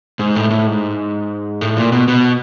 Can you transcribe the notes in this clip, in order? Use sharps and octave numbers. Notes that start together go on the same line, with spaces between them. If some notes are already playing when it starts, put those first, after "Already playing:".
G#2
A2
A2
G#2
A2
A#2
B2
B2